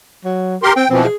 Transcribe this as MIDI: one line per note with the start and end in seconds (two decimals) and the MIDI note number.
0.25 0.56 54
0.63 0.73 67
0.63 0.73 70
0.63 0.73 84
0.76 0.85 60
0.76 0.89 79
0.90 1.06 47
0.90 1.06 52
0.90 1.06 53
0.90 1.02 60
1.04 1.16 68